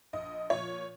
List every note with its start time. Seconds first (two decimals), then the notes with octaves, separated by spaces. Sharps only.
0.13 A#1 D#5
0.50 A#2 F3 C#5